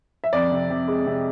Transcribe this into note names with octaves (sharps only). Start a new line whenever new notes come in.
E5
F2 D5
C3
C3
G#3
C3